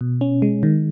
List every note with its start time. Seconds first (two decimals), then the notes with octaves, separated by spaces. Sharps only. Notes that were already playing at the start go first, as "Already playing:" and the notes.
0.01 B2
0.21 C#4
0.42 G#3
0.63 D#3